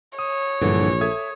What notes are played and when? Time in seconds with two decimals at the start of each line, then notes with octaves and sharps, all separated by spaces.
0.19 C#5 D#6
0.61 A#1 G2 D3 E3
1.01 A4 E5 D#6 G#6